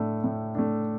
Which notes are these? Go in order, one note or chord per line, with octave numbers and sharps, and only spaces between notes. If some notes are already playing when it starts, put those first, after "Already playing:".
Already playing: A2 A3 D4
A2
A3 D4